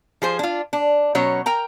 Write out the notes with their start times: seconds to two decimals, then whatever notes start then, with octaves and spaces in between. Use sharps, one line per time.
0.22 F3 G#4 C5
0.39 D4 F4
0.73 D4
1.15 B2 F#3 C#4 C#5
1.46 A#4 G5 A#5